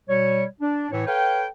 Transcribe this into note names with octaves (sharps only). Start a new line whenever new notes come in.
B2 G3 C#5
D4
A2 E3 C#5
A4 B4 C#5 F5 G5